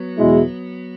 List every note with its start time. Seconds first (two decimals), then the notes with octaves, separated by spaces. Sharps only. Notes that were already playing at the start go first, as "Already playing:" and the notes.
Already playing: F#3 B3
0.18 E2 B2 G#3 E4